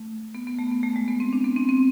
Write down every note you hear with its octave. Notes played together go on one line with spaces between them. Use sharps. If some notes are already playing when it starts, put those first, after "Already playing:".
Already playing: A3
B3
B3
A3
B3
A3
G#3
B3
C4
D4
B3
C4
C4